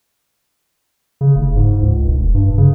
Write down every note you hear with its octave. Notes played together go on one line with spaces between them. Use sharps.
C#3
F1
G#2
C#2
E1
G2
C#3